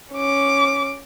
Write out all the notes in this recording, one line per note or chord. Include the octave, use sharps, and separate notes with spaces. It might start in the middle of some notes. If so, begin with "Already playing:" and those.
C#4 D6